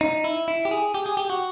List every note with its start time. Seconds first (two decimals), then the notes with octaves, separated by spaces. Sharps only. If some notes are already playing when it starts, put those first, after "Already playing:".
0.01 D#4
0.24 E4
0.48 E4
0.65 G4
0.71 G#4
0.94 G4
1.06 G#4
1.17 G4
1.30 F#4